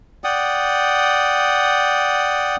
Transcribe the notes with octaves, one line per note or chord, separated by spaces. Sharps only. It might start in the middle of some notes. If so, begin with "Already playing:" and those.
D5 F#5 G5 D#6